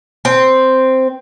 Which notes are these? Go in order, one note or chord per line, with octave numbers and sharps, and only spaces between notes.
C4